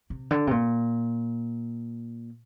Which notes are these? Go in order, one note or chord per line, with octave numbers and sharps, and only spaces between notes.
C3
D3
C3
A#2